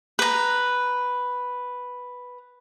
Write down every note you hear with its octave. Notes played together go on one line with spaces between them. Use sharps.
B4 A#5